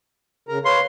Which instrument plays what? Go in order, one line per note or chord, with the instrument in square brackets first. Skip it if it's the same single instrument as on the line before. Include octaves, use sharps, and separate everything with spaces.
[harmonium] C#3 A#4 A#5
[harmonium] B4 C#5 F5 [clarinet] C6